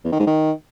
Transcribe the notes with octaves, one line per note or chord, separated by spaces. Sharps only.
E2
D#3
G#2
D#3